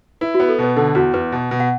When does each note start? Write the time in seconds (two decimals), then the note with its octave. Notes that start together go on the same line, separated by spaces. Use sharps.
0.21 E4 B4
0.35 F#4
0.40 B3
0.49 A4
0.59 B2 B4
0.77 D3 A4
0.95 E2 F#4
1.14 E2 B4
1.32 B2
1.51 B2
1.60 F#5